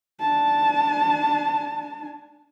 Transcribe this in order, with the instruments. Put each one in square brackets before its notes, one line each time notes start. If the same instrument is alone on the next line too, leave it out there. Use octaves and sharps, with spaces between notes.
[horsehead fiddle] D4 A5